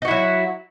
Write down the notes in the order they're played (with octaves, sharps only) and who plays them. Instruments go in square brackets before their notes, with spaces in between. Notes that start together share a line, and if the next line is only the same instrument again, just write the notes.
[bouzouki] D#4
F#4
E4
F#3